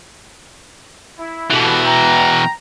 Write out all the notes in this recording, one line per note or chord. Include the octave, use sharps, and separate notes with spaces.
E4
B2 E3 G4 A4
G5 A#5